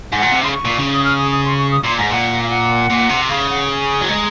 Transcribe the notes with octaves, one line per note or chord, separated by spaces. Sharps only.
G#2 F#5
A#2
C3
C#3 C6
C#6
A#2
C#3
D#6
F6
D#6
D#6
C6
C#6
D#6
A#2 C6
G#2 A#5
A#2 F#5
F5
F#5
A#2
C3
C#3 F5
F#5
G#5
F#3
G#3 A#5